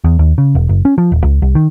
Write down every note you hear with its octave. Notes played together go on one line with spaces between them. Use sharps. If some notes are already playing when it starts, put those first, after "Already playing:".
E2
D#2
C#3
E1
F#1
C#4
F3
D#1
C#2
C2
D#3